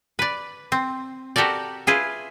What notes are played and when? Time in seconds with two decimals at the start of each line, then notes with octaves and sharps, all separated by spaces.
0.19 B4 D5
0.72 C4
1.36 F#4 G4 A4 A#4 D5
1.87 E4 F4 G#4 B4